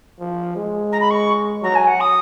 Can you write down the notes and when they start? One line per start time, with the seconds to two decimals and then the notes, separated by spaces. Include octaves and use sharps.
0.20 F3
0.56 G#3
0.92 A#5
1.00 B5
1.10 C#6
1.63 F#3 A#5
1.75 G#5
1.87 F#5
2.00 D#6